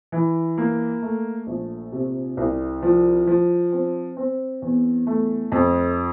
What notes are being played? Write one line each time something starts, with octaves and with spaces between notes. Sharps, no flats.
E3
A#3
A3
A#1
C3
C2
F3
F3
C4
C4
E2
A3
F2